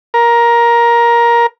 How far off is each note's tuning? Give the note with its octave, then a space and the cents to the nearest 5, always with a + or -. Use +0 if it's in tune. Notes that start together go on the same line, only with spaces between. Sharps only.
A#4 +15